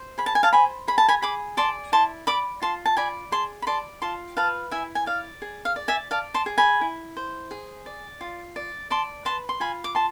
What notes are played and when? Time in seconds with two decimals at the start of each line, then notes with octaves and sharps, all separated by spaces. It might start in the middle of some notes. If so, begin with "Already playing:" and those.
Already playing: C5
0.18 G#4 B5
0.26 A5
0.35 G#5
0.43 F5 A5
0.53 C5 G#5 B5
0.88 G#4 B5
0.98 A5
1.08 G#5 B5
1.22 G#4 B5 D6
1.57 D5 A5 C6
1.92 E4 A5 C6
2.27 D5 B5 D6
2.62 F4 A5 C6
2.85 A5
2.97 D5 G#5 B5
3.32 G#4 A5 C6
3.62 B5
3.67 D5 A5 C6
4.02 F4 A5 C6
4.37 B4 F5 A5
4.71 E4 E5 G#5
4.95 G#5
5.06 D5 F5
5.42 G#4
5.65 F5
5.76 D5
5.88 E5 G#5
6.11 D5 F5 A5
6.34 A5 C6
6.46 G#4
6.58 G#5 B5
6.81 E4
7.17 C5
7.51 G#4
7.86 D5
8.21 F4
8.56 D5
8.90 D5 A5 C6
9.25 B4 A5 C6
9.49 C6
9.60 F4 G#5 B5
9.84 D6
9.95 A5 C6